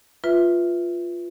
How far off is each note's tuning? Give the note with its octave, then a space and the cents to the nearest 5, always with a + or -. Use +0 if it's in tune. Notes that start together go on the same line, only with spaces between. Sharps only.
F4 +0 B4 +0 E5 +0